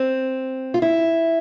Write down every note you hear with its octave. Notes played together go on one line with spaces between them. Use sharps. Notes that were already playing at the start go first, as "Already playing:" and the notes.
Already playing: C4
F4
E4